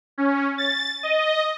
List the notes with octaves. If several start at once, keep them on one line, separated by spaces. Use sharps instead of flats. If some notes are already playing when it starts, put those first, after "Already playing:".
C#4
A6
D#5